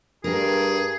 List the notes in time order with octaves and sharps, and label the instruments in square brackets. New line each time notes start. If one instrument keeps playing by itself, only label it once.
[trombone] G2 [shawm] G#4 [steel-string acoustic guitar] A#4